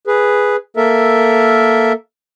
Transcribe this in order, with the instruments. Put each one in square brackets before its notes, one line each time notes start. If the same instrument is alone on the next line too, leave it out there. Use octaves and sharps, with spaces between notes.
[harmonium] G#4 B4
A#3 A4 A#4 E5